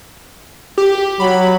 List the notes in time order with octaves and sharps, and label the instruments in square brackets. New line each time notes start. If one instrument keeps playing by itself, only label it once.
[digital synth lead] G4
[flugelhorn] F#3 [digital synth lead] B5